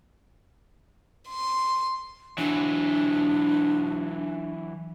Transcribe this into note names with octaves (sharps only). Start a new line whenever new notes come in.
C6
E3 F#3 D4